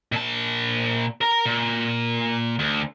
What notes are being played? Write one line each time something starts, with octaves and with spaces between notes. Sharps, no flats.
A#2 A5
A#4 A#5
A#2
D2